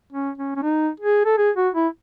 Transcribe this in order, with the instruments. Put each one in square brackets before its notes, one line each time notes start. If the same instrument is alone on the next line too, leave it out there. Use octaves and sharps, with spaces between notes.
[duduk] C#4
C#4
C#4
D#4
G#4
A4
G#4
F#4
E4